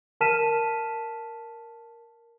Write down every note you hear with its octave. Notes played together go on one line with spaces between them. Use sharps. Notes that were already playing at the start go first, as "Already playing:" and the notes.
A#4 A5 F6 B6 D#7 E7